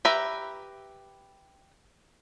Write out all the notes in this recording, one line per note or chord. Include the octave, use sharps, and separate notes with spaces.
G4 B4 E5 A#5